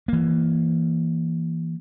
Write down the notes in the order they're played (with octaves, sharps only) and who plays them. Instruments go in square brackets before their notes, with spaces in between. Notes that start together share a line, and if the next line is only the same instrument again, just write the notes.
[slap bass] E3 A#3